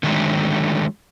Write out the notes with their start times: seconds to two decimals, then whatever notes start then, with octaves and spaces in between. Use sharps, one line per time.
0.03 D3 D#3 F#3 G#3 A3